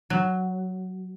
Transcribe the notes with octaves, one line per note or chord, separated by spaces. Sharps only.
F#3